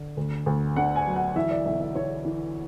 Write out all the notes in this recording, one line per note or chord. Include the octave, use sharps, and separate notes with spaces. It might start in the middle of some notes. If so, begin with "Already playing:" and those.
Already playing: D3
D2
D2
D3 F#5
G#5
F#3
F#5
E3 E5
D5
B1 E5
E5
E3 C#5
E3